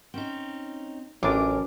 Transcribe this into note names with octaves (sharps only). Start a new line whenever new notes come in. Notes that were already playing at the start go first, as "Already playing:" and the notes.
C4 C#4 D#4
A1 F#2 A2 E3 D4 A#4 G#5 D6